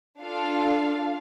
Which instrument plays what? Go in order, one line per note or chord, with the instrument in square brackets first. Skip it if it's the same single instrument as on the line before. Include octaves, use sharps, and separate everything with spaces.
[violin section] D4 F4 A4 F5